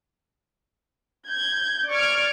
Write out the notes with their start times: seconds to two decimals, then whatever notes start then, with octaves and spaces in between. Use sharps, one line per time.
1.28 G6 G#6
1.90 D5 C#6 F6 G#6 D7